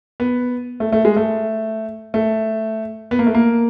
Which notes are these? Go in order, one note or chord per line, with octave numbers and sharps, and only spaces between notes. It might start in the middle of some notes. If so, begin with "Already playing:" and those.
B3
A3
A3
G#3
A3
A3
B3
A#3
A3
A#3